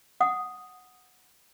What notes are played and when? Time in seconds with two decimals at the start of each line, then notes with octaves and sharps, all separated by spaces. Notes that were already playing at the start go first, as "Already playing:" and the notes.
0.21 F#5 D#6